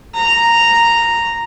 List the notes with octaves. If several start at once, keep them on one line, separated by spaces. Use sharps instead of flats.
A#5